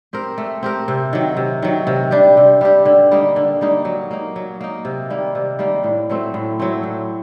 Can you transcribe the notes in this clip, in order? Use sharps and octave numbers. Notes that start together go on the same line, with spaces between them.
C4 G4 A#4
A3
C4 G4 A#4
C3
D#3 F#3
C3
D#3 F#3
C3
G3 D4 G4
C3
G3 D4 G4
D3
G3 A#3 D#4
D3
G3 A#3 D#4
F#3
A#3 D#4
F#3
A#3 D#4
C3
D#3 G3 A#3
C3
D#3 G3 A#3
A2
F#3 A3 C4
A2
F#3 A3 C4
A2